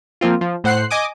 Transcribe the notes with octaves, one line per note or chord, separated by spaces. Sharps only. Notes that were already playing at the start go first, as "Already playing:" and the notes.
F3 A#3 C4 F4
F3
A2 C5 F#5 F#6 C7
D#5 G#5 D6 D#6